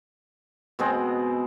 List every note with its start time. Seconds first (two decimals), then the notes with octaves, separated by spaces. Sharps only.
0.79 B2 G#3 C4 D#5